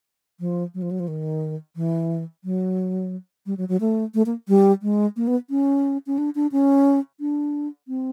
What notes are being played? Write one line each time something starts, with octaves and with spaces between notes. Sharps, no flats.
F3
F#3
F3
F#3
F3
D#3
E3
F#3
G3
F#3
F#3
A3
A3
A#3
G3
G#3
A#3
B3
C#4
C#4
D4
D4
C#4
D4
C4